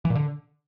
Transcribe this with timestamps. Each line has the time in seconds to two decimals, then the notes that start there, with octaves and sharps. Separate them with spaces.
0.05 E3
0.10 A#2
0.15 D3